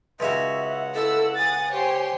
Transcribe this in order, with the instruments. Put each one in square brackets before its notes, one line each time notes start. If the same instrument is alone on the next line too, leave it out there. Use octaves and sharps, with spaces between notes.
[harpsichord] C#2 C#4 F#4 [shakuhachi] E5
[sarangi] F#5
[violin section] E4 E6 [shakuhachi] A4
[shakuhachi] G#5 [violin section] D#6 A6
[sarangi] G4 [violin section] C5 C#5 C6